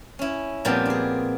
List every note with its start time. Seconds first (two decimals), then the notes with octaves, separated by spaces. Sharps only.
0.19 C#4 E4
0.65 A#2 F3 G3 B3 C4 D4
0.85 D4 G#4